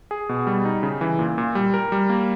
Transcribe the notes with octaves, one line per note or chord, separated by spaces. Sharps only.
G#4
B2
G3
D#4
C#3
E3
A#2
A#2
G3
A#4
G3
A#3